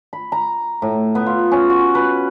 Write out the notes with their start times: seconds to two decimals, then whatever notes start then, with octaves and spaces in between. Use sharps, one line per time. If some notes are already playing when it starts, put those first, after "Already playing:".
0.13 B5
0.32 A#5
0.82 A2
1.15 B3
1.26 F4
1.52 C#4
1.70 F#4
1.95 B4